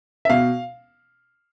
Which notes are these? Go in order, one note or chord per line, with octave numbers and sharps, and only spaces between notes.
E5
B2 F5